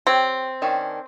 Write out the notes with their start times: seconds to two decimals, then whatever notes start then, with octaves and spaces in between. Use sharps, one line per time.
0.07 C4 G4 C#5
0.62 D#3 C#4 D4